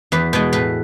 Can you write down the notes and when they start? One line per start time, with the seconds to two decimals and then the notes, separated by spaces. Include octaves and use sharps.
0.12 E2 B4
0.33 B2 G#3 B3 B4
0.53 A2 B4